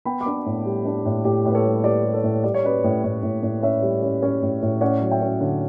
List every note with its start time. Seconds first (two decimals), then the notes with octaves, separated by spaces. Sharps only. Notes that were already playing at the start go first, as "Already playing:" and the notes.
0.05 B3 G5 B5
0.21 B5 D6
0.26 D4
0.46 A2
0.66 G3
0.85 D4
1.05 A2
1.24 A2 G4
1.45 A2 B4
1.54 A4 C#5
1.65 G3
1.84 G3 B4 D5
2.05 G3
2.14 A4 C#5
2.24 A2
2.44 G3 D5
2.54 C#5
2.64 C#4 B4 D5
2.84 A2
3.04 A2
3.23 A2
3.43 A2
3.62 C#4 C#5 E5
3.82 G3
4.02 C#4
4.23 C#4
4.43 A2
4.62 A2
4.81 C#4 D5 F#5
5.01 F#3
5.11 E5 G5
5.21 C#4
5.41 D3